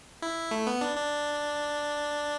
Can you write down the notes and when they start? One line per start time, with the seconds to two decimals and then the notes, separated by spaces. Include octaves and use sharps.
0.22 E4
0.51 A3
0.67 B3
0.81 D4
0.97 D4